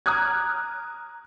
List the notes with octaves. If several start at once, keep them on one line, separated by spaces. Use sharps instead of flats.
A#5 D6 D#6 F6 F#6 G#6